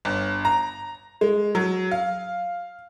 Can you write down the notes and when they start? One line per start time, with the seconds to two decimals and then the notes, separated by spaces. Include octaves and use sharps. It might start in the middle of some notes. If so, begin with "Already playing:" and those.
0.05 G1
0.45 A#5
1.21 G#3
1.55 F#3
1.91 F5